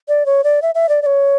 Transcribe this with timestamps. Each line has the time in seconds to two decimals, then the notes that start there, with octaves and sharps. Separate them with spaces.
0.08 D5
0.26 C#5
0.44 D5
0.62 E5
0.75 E5
0.89 D5
1.02 D5
1.06 C#5